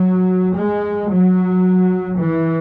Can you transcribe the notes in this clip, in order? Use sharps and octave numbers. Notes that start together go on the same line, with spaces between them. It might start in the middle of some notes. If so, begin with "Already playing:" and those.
Already playing: F#3
G#3
F#3
E3